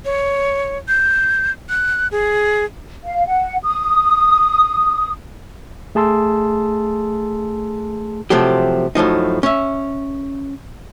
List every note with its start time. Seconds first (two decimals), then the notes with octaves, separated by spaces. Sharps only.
0.05 C#5
0.88 G6
1.69 F#6
2.11 G#4
3.04 F5
3.26 F#5
3.64 D#6
5.95 A3 G#4 A5 C6 E6
8.30 C3 F3 F#3 A3 G4
8.95 F#2 A2 F3 D#4
9.43 C#4 E5